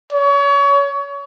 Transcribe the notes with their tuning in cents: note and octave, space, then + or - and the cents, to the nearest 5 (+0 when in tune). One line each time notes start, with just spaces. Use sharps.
C#5 +30